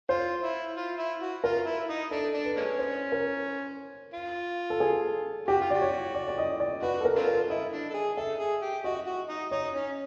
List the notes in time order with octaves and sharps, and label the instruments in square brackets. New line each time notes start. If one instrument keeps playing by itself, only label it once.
[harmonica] F4 [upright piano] C5
[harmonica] E4
F4
E4
F#4
[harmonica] F4 [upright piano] A#4
[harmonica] E4
D#4
[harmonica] D4 [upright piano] A4
[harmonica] D4
[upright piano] B4
[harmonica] G#3 A#3 C#4
[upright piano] C5
A#4
[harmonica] F4
[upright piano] A4
G#4
[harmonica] F#4 [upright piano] G4
[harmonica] F4
[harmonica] F#4 [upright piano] D5
[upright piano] C#5
D5
D5
D#5
D5
[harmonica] F#4 [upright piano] B4
[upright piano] A4
A#4
[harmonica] C4 D4 F4
[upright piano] A#4
[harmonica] E4 [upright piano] D#5
[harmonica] D4
A4
G#4
[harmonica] A4 [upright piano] E5
[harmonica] G#4
G4
[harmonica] F#4 [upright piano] D#5
[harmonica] F#4
D#4
[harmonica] D#4 [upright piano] C#5
[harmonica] C#4